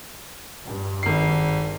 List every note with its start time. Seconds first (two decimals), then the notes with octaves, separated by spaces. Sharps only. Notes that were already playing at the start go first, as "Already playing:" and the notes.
0.64 G2
1.03 G#1 C7